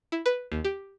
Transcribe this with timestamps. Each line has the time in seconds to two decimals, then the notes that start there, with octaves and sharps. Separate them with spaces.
0.12 E4
0.26 B4
0.52 D#2
0.65 G4